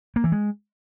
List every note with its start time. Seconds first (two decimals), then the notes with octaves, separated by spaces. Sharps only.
0.16 A#3
0.24 E3
0.32 G#3